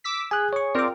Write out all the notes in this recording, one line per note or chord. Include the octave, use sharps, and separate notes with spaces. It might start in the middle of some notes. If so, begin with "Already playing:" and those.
D6 E6 B6
G#4 G#5 F#6
C#5 C#6
C4 F4 A#4 D5 D6